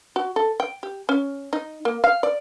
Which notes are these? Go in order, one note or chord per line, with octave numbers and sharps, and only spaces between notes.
F#4
A4
G5
G4
C#4
D#4
A#3
F5
D5